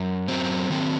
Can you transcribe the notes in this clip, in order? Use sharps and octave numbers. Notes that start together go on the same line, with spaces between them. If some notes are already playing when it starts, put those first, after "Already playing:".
Already playing: F#2
F#2 F#3 C4
D#3 F#3 C4